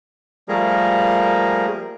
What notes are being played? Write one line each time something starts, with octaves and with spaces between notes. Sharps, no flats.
F3 G3 A3 A#3 G#4 A#4